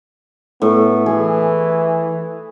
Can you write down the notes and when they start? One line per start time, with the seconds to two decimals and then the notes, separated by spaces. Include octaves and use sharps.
0.62 A2 B3
1.06 E3 G#4